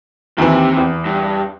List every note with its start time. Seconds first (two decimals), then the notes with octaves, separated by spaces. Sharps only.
0.38 D#2 C3 E3
0.77 E2
1.05 G2